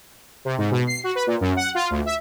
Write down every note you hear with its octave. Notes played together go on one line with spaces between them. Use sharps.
C3
G#2
B2
C7
F#4
B4
A#2
F#2
F#5
F4
D2
E5